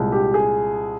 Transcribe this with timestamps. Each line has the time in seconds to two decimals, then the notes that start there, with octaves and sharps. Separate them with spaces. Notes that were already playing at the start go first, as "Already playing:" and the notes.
Already playing: C2 A#2 G#3
0.12 G4
0.34 G#4